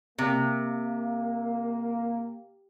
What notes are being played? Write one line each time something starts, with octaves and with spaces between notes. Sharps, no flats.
C3 A#3